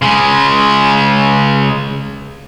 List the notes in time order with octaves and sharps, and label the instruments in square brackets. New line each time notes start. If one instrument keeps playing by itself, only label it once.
[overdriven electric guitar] C#3 G#3